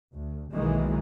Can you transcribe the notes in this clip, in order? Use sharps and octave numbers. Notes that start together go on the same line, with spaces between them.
D2
B1 D#3 E3 G#3 A#3